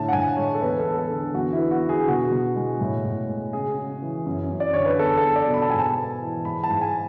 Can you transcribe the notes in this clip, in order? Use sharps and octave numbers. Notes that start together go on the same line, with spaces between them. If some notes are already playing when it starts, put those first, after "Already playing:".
Already playing: A2 D3 A5
F#5
A2 G#5
G#3 C#5
A4
E2 B4
A4
B3
A4
D3
E2 F#4
E4
B3
F#4
D3
G#4
B2 F#4
B2
G#3
A2
A2
G#3
C#3 G#4
C#3
E3
F#2
F#2
D5
D3 C#5
B4
E2 A4
A4
E2
D5
B2
B5
A5
G#2 G#5
A5
B3
E3
G#2 B5
A5
G#2
G#5